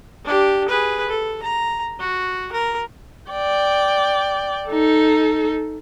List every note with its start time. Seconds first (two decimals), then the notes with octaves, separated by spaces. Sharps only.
0.25 D4 G4
0.68 G#4 B4
1.09 A4
1.43 A#5
2.00 F#4
2.52 A#4
3.31 D5 G5
4.68 D#4 A4